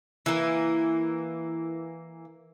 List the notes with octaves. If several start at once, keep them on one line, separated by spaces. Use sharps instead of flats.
E3 A#3